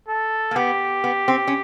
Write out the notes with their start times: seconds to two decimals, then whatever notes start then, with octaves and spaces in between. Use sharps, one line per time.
0.08 A4
0.51 A#3
0.56 B3 G4
1.04 B3
1.28 C4
1.47 C#4